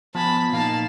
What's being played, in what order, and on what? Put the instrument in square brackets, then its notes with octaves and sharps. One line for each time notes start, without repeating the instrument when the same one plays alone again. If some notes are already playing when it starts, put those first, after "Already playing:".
[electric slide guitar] F3 B3 G#5 [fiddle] A5 B5
[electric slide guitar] A#2 A#3 D#4 [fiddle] F5 A5